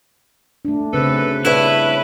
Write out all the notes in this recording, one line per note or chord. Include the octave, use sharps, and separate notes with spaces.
A3 D4
F#2 C#3 C4 A4 B4
G2 E4 B4 C#5 E5